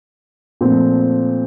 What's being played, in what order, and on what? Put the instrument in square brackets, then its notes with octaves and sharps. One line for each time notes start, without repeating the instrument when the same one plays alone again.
[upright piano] A#2 F3 A3 C4